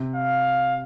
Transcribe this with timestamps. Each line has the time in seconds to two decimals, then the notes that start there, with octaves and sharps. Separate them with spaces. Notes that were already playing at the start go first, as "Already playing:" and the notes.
Already playing: C3
0.16 F5